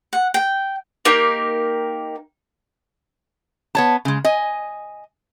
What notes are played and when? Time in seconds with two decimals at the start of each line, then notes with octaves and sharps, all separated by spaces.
0.13 F#5
0.34 G5
1.05 A#3 D#4 G4 A#4
3.75 B3 C#5 A5
4.05 C#3 G#3
4.24 D#5 G#5